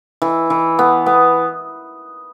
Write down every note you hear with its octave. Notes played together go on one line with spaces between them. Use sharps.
E3
E3
B3
B3